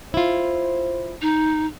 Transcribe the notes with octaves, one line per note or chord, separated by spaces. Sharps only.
E4 F4 C5
D#4